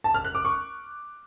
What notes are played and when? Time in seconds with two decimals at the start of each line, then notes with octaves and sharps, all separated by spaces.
0.04 A5
0.14 F6
0.25 F#6
0.35 D6
0.45 C#6